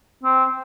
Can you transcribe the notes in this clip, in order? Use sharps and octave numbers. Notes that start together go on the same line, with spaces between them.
C4